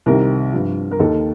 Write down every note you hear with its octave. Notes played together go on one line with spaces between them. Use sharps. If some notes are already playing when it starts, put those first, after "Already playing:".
C2 C3 D#3 A#4
G2 F3
A#4
D#2 D#3 A4